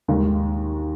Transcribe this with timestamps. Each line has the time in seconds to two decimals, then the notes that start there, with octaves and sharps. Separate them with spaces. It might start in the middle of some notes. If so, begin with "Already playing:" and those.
0.08 D#2 D#3 G#3